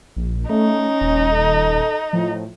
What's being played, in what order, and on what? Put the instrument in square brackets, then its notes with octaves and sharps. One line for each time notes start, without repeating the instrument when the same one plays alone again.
[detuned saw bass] A#1
[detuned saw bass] A3 [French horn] C#4 [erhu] D#4
[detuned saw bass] D#1
[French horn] A4
[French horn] A2 [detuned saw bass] F3